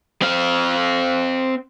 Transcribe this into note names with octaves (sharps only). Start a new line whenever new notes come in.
C4 F5